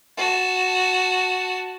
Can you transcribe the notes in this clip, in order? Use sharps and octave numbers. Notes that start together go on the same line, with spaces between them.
F#4 A5